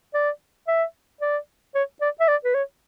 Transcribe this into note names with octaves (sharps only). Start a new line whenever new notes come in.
D5
E5
D5
C#5
D5
E5
D5
B4
C#5